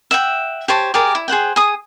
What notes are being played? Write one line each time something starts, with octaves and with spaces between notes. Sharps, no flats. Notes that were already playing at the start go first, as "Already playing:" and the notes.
E5 F#5 G5
G4 C5 C#5 A5
G4 G#4 A#4 D5
E4
G#4 C5 F#5 G5
G#4 D#6